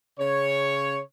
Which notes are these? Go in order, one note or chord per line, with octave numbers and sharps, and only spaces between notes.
C#3 C#5